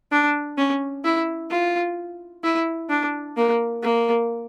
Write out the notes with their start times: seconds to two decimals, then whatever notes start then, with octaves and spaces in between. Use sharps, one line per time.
0.12 D4
0.57 C#4
1.04 E4
1.50 F4
2.44 E4
2.90 D4
3.37 A#3
3.83 A#3